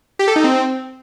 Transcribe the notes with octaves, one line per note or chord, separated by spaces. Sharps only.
G4
A4
D#4
C4